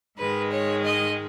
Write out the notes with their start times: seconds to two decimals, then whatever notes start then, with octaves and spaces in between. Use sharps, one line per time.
0.18 G#2 D#3 G#3 B4
0.52 C#5
0.85 D#5